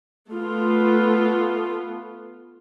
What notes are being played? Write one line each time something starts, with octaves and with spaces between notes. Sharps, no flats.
A3 B3 F4